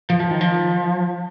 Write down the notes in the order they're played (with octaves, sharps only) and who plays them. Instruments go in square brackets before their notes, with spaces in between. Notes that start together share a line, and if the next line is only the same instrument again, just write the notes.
[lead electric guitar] F3
F3
D#3
F3